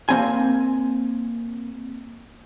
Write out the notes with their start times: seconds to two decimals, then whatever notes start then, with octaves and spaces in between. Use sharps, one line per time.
0.09 A#3 C4 G#5